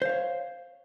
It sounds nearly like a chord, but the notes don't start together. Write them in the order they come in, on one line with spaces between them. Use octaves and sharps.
C5 F5 C#5